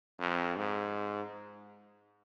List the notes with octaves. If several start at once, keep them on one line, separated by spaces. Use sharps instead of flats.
F2
G#2